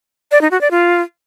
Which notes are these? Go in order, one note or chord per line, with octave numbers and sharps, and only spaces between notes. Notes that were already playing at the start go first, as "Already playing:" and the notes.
D5
D#4
F#4
D5
F4